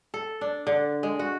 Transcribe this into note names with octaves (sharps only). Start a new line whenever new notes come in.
A4
D4
D3
G#3
F#4